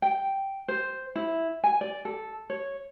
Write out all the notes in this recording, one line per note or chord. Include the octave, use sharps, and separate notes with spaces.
G5
C5
E4
G#5
D5
A4
C#5